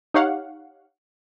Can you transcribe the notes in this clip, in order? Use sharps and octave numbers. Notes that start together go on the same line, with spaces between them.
D#4 G4 C#5 F5 F#5